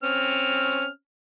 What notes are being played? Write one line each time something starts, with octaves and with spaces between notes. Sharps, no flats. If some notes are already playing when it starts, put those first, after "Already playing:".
C4 C#4 F6